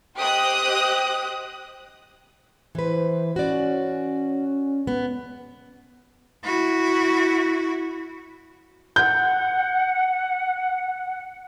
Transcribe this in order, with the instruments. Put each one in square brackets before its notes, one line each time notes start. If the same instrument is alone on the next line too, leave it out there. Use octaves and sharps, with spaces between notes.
[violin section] G4 C5 D#5 D#6 F#6
[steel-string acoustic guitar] E3 B4 [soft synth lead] C5
[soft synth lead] C#4 [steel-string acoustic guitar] F#4 D5
[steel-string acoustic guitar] B3
[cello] E4 F#4
[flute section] F#5 [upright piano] G6